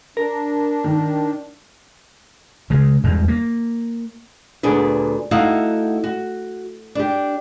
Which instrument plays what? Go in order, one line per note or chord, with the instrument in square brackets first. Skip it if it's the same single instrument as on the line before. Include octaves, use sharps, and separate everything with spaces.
[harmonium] D4 [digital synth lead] A#4
[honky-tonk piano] D#3
[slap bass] C#3 G#3
E2 G3 G#3
A#3
[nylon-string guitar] D2 A#2 B3 D4 G#4 B4
A3 D#4 E4 F#4 F5 F#5
F#4
D4 G4